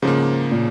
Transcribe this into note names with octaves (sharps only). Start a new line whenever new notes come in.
G#2 C#3 F3 A#3
A#2